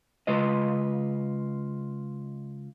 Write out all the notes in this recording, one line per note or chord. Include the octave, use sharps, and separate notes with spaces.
C#3 G#3 F4 B4 D#5